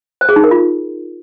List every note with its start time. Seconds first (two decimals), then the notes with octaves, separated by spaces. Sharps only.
0.21 C5
0.29 G#4
0.36 D#4
0.44 A#4
0.51 F4